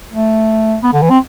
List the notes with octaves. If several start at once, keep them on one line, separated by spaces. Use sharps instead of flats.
A3
B3
D3
E3
C4